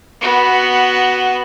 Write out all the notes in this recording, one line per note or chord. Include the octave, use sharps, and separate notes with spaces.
B3 F#4